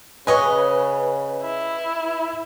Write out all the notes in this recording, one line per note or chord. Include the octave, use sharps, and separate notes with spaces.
C#3 B4 C#5 D#5 G#5
E4